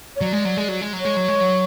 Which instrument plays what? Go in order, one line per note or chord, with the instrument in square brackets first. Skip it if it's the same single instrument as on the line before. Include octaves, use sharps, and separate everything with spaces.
[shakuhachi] C#5
[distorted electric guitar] F#3 [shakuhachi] D5
[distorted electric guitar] G#3
F#3
G#3
F#3
G#3
F#3
[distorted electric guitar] G#3 [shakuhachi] C#5
[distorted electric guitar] F#3
G#3
F#3